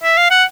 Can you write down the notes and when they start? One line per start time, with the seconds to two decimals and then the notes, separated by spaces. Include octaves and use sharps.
0.04 E5
0.18 F5
0.31 F#5